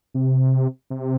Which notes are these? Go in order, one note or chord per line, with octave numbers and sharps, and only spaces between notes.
C3
C3